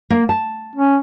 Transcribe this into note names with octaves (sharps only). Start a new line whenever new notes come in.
A#3
A5
C#4